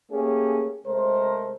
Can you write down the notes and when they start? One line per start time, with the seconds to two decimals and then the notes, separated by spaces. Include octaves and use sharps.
0.11 A3 A#3 C#4 G4 G#4
0.85 C3 G#3 A3 A#4 C5